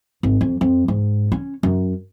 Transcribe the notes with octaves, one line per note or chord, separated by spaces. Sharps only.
G#1
F2
F2
G#2
C#4
F#2